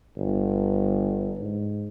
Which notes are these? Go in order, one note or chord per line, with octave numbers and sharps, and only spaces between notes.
G1
G#2